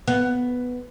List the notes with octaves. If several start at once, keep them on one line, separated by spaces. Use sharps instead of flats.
B3